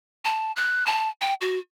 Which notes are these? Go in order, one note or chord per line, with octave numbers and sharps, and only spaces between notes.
A5
F#6
A5
G5
F#4